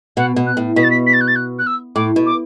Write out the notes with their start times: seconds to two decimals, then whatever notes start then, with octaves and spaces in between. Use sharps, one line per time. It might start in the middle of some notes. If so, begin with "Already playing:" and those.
0.17 B2 F#5
0.36 B2
0.47 F#6
0.57 A2
0.76 B2 B6
0.83 A6
0.91 B6
1.07 B6
1.13 A6
1.21 F#6
1.28 A6
1.36 F#6
1.59 F#6
1.67 E6
1.96 A2 D6
2.16 B2
2.26 D6